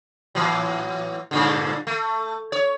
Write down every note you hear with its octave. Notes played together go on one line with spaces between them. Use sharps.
A2 E3 F#3
G2 A#2 D3
A3
C#5